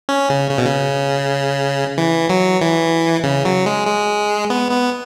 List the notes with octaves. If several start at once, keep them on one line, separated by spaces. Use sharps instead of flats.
C#4
C#3
C#3
B2
C#3
E3
F#3
E3
C#3
F#3
G#3
G#3
B3
B3